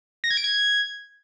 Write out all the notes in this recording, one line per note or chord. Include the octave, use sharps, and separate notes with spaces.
A#6
G#6
D7
G#6